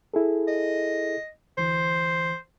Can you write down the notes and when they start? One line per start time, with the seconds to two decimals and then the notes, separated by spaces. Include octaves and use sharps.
0.14 E4 G#4 A4
0.48 D#5
1.58 D2 E3 C5